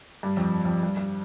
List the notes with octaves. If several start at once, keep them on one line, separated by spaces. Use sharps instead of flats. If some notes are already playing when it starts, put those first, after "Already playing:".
G2
F2
F2
G2
G2